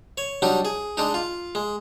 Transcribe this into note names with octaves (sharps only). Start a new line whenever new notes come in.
C#5
F#3 G3 D4 D#4
G#4
G#3 D4 D#4
F4
G#3